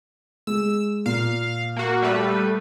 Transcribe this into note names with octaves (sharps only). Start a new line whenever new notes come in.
G#3 E6
A#2 F5
A#3 F#4
G3 A3 B4